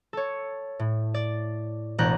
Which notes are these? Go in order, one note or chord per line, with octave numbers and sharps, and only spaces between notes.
A4 C#5
A2
D5
E1 A1 D4 A#5 F#6 G6